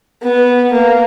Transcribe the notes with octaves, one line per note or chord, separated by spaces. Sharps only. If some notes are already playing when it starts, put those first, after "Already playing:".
B3
A#3